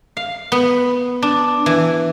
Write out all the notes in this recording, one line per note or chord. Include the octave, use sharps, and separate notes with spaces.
F5
B3
D4
E3